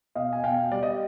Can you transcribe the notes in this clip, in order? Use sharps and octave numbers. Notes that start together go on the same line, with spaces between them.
B2 D#5 F5
G#5
B2 F5 G5
G3 D5
D#5